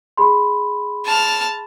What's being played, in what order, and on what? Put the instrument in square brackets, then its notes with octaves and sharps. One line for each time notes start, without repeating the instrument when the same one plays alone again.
[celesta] G#4 B5 C6
[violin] A5 F6